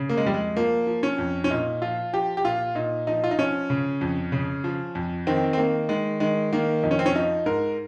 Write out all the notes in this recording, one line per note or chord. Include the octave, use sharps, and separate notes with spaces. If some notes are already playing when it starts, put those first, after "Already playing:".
Already playing: C#3
A#3
G#3
F2 G3
G#3
F3 A#3
F3
C#4
F2
C#4
A#2 D#4
F3 F4
F3 G4
G4
A#2 F4
A#2 D#4
F3 D#4
F4
D#4
F3 C#4
C#3
F2
C#3
F3
F2
D#3 C4
C4
D#3 A#3
D#3 G#3
D#3 G#3
D#3 A#3
F2 D#4
C#4
C4
C#4
F3 D#4
G#2 A#4